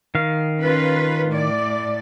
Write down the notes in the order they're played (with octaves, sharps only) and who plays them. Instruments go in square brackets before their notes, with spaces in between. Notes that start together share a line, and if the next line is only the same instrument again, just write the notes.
[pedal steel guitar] D#3 F5
[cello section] C#4 F4 B4
A2 D5